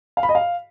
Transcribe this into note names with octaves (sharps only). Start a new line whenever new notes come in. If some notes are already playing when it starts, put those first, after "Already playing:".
F5
B5
D#5
F5